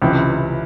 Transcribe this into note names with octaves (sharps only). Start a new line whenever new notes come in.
C#2 C3 E3